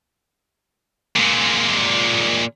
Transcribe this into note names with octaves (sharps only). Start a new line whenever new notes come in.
A#2 G#3